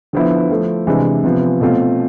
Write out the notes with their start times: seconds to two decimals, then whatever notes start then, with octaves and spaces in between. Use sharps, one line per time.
0.13 D3 F3 B3 E4
0.50 F3 A3 E4
0.87 C3 E3 G#3 D4
1.24 C3 F3 B3 F4
1.61 B2 A3 C4 F4